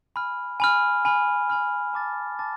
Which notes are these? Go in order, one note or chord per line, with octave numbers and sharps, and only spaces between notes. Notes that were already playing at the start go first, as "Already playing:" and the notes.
G#5 B5 F6
G#5 B5 F6
G#5 B5 F6
G#5 B5 F6
A5 D6 A6
A5 D6 A6